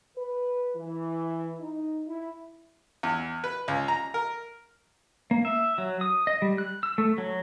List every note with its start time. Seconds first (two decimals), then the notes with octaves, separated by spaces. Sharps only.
0.17 B4
0.75 E3
1.61 D#4
2.07 E4
3.03 E2
3.44 B4
3.68 C#2
3.88 A#5
4.14 A#4
5.31 A#3
5.45 E5
5.78 F#3
6.01 D#6
6.27 D#5
6.42 G3
6.58 F#6
6.83 E6
6.98 A3
7.18 F#3